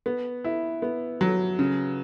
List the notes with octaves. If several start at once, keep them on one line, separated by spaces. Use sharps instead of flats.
B3
E4
B3
F#3
C#3